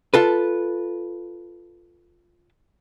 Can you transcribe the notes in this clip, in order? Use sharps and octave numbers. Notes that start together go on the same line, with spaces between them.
F4 A4 B4